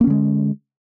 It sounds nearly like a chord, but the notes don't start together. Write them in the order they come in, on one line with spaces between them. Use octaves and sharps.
A#3 C#4 D3 G#3